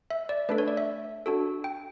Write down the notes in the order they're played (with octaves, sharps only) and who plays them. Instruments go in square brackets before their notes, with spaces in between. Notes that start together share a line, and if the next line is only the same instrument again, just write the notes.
[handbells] E5
D5
A3 D4 A4 B4
C#5
D5
E5
D4 F#4 A4
G5